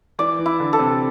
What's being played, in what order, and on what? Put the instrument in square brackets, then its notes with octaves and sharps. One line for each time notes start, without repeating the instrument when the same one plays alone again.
[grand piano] E3 [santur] D5
[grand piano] E3
[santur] E4
[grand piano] D3
[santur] A4
[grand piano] C3